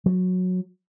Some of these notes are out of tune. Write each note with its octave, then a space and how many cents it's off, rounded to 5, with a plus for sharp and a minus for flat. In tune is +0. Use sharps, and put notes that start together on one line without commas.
F#3 -15